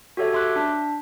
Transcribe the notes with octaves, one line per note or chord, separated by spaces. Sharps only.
F#4 G4 A4 C#5 E5
E5 C6 D6 F#6
D4